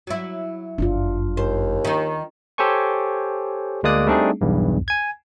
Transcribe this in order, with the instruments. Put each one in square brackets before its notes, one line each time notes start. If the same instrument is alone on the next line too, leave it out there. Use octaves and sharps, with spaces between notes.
[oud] F#3 E4
[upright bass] G1 F#2 [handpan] D4 F4
[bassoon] D#2 [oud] C5
[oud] D#3 D#4
[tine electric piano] G4 A4 C5 C#5 G#5 C#6
D2 G#3 A#3 D5 D#6 F#6
G3 A3 C4 D4 D#4 G#4
B1 E2 G2
G#5 G#6